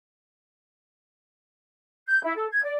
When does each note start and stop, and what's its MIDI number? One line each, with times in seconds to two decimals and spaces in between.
2.07 2.20 91
2.23 2.34 64
2.36 2.47 69
2.50 2.61 92
2.64 2.77 74